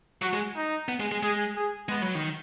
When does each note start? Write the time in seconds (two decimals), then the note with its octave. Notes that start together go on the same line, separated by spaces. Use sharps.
0.22 F#3 F#4
0.33 G#3
0.56 D#4
0.88 B3
1.00 G#3
1.12 G#3
1.23 G#3 G#4
1.56 G#4
1.89 G#3 B3
2.02 F#3
2.15 D#3